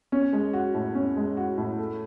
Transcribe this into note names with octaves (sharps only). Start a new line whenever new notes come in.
C#4
G#3
F#4
A2
C#4
G#3
F#4
A2
A3